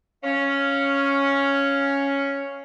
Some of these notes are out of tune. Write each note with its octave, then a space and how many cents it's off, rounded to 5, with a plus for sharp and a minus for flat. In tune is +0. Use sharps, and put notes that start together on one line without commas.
C#4 +0 F5 +0